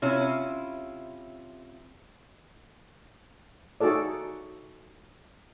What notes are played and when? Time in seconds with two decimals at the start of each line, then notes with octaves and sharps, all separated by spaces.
0.02 C3 C#4 E4 F4
3.81 D#4 F#4 G#4 A4 D5